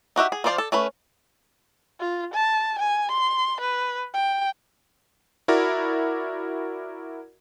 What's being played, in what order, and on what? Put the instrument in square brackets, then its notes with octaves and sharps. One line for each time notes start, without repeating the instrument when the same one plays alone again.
[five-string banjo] D#4 F#4 G4 E5
G#4
F3 F4 C5 D5 F5
A4
A3 C#4 B4
[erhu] F4
A5
G#5
C6
B4
G5
[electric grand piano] E4 F#4 A#4 D5